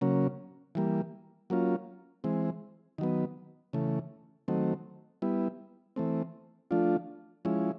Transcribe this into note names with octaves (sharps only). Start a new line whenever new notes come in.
C#3 F#3 A#3 C#4
E3 G3 A#3
F#3 A#3 C#4 F4
E3 G#3 C4
D#3 F#3 B3
C#3 E3 A3
D#3 F#3 A3 C4
G3 B3 E4
E3 A3 C4
F3 A3 D4 F4
F3 G#3 C#4 E4